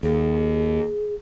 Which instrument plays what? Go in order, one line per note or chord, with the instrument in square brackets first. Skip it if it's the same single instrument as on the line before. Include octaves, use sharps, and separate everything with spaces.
[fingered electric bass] D#2 [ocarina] G#4